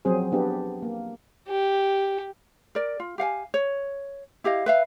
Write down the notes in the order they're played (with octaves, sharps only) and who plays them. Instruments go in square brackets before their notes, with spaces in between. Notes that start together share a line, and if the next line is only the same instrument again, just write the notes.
[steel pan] F3 F#3 C4 G#4 C5
B3 D4 G4
A#3
[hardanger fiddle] G4
[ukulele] A#4 D5
F4
G4 F5 F#5 G#5
C#5
E4 G4 D#5 F5
B4 E5 F5